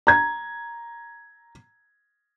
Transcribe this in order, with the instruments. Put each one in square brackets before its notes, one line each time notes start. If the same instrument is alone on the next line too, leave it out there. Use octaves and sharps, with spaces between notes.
[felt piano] A#5 G#6